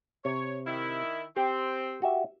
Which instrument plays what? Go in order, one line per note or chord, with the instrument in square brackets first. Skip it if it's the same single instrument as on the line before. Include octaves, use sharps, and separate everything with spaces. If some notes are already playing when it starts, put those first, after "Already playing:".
[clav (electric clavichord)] C3 [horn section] C#5
[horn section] D#3 E4 E5
[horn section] C4 [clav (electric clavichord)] G4
[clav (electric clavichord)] F#4 G4 E5